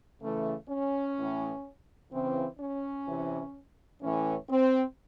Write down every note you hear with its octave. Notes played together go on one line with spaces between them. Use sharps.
C#3 E3 A3
C#4
A2 E3
C#3 E3 C4
C#4
C3 E3
A2 E3 C#4
C4